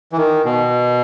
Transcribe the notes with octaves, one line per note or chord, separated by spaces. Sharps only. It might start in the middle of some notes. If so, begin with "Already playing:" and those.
E3
D#3
B2